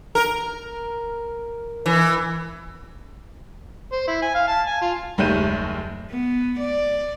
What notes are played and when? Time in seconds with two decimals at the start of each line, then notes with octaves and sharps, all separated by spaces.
0.15 A#4
1.86 E3
3.92 C5
4.08 E4
4.22 G#5
4.35 F5
4.48 A5
4.67 G#5
4.82 F4
5.18 F#1 D#2 G3 A3 G6 D#7
6.11 B3
6.59 D5